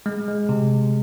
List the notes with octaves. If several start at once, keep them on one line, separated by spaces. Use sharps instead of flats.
G#3
G#3
C3